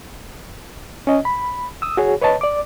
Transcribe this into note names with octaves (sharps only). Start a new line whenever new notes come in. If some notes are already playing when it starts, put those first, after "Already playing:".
C#4 D#5
B5
D#6 E6
F#4 G#4 C#5
B4 C#5 D#5 A5
D5 D6